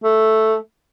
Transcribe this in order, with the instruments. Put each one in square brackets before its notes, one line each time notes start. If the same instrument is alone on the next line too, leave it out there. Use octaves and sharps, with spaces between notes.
[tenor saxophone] A3